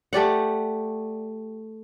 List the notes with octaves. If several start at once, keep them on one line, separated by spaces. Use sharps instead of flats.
A3 G4 D5 F#5